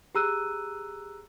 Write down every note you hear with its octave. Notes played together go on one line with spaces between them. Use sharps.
G4 G#4 A#5 E6 F#6 D#7